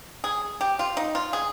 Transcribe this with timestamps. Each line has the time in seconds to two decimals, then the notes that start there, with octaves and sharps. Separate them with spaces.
0.24 G#4
0.61 G4
0.79 F4
0.97 D#4
1.15 F4
1.33 G#4